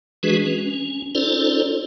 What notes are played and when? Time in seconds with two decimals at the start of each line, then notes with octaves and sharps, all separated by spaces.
0.23 E3 G#3 D4 F#4 G#4 B4
0.46 C#4
1.15 C#4 D#4 F4 A4 C5 D5